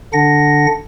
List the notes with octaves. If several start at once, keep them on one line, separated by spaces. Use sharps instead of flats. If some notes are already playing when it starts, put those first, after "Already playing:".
D3 D4 F#5 A#6